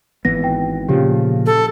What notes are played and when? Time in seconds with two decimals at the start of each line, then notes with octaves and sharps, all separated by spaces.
0.25 G#1 E3 B3 A#6
0.44 G5
0.89 A#2 C#3 F3 G4
1.46 A4